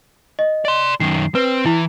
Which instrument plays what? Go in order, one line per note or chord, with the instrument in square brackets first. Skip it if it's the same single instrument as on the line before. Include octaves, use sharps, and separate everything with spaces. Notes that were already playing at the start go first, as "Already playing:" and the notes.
[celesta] D#5
[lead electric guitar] D5 C6
[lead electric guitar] F#2 D#3 [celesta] C7
[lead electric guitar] C4 [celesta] B4
[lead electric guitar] E3 [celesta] E4